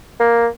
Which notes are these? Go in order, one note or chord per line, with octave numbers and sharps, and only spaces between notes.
A#3